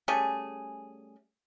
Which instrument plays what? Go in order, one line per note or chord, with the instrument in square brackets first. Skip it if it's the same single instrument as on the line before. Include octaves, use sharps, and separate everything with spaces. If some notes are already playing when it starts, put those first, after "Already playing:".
[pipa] G3 A3 C#4 G#4